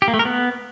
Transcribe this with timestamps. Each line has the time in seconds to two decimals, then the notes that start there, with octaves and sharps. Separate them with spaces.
0.02 G4
0.08 A#3
0.14 A3
0.19 A#4
0.25 B3